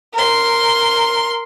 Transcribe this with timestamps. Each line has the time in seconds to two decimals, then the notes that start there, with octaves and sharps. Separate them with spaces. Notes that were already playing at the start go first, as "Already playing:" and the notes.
0.14 A#4 C6